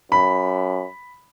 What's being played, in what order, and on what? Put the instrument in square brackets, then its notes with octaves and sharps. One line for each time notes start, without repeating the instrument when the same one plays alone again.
[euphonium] F#2 [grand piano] B5